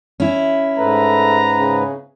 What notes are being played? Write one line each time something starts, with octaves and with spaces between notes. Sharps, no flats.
C#4 E4
G#2 A3 B4 A#5
C#3